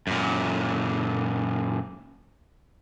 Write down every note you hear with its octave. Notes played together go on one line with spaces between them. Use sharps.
F#2 A#2